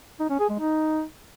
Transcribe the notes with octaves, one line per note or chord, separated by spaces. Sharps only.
D#4
C#4
G#4
G#3
D#4